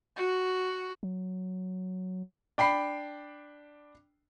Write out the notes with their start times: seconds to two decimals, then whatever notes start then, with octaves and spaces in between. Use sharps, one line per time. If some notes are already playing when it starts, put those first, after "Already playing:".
0.16 F#4
1.03 F#3
2.58 D4 G5 B5 C7